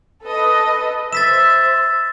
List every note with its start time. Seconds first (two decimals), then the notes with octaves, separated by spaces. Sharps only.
0.23 A4 B4 D#5
1.13 C5 E5 A6 B6 E7